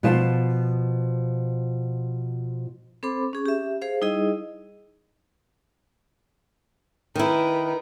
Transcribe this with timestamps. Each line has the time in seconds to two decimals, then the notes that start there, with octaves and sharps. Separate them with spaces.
0.03 B2 F3 F4 A5
3.03 C4 A4 C5 B5 D6
3.33 C#4 G#4
3.46 G4 E5
3.82 G#4 C5 F5
4.01 G3 D#4 E4 G#4 D#5
7.15 D#3 E4 A#4 B4